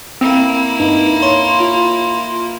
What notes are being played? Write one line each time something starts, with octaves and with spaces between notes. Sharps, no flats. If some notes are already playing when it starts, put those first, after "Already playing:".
A#3 C4 E4
G2 D#4
C#5 C6
F4